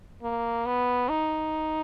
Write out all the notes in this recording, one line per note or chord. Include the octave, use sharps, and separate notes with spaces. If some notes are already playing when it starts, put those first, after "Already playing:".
A#3
B3
D#4